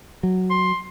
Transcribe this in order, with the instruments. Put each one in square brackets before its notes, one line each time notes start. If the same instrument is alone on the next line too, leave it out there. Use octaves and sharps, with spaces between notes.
[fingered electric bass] F#3
[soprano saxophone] C6